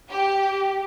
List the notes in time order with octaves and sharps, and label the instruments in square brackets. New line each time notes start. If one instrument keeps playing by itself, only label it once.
[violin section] G4